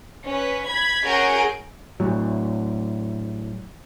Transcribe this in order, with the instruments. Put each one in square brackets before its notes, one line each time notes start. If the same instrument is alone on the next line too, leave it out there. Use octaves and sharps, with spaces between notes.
[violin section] C#4 B4
B5 G#6
C#4 F#4 G#4 A#4 G6 D7
[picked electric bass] A2 F#3